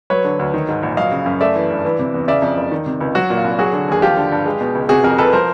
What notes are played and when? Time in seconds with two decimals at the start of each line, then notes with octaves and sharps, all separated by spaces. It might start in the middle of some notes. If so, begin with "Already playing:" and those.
0.10 F#3 B4 C#5
0.24 D3
0.39 D2
0.54 D#3
0.68 G#2
0.83 A#1
0.97 F#3 D#5 F5
1.12 C#3
1.26 F#2
1.41 A3 D5 E5
1.55 E3
1.70 G2
1.85 E3
1.99 C3
2.14 E2
2.28 C#3 D5 E5
2.42 F2
2.57 F#1
2.71 D#3
2.86 C3
3.01 C#2
3.15 F#3 F#4
3.30 A#2
3.37 F4
3.44 C2
3.58 F#3 F#4 G#4
3.73 D3
3.88 D#2 G#4
4.02 F3 F4 G4
4.17 D3
4.32 G2
4.46 G#3
4.61 B2
4.75 C#2
4.89 C3 F#4 G#4
5.04 F2 G#4 A#4
5.18 F1 A4 B4
5.33 F3 A#4 C5